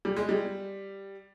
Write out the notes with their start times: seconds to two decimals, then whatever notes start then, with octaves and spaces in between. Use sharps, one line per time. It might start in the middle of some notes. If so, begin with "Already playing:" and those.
0.05 G3
0.16 G#3
0.29 G3